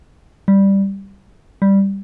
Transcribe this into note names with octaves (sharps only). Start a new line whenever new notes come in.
G3
G3